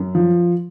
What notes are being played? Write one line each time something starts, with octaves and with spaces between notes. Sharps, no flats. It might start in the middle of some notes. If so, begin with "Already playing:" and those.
Already playing: F#2
F3